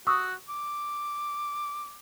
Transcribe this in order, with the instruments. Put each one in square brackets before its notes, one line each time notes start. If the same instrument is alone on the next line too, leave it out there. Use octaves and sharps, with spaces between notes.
[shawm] F#4 [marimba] C#6 D#6 E6
[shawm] D6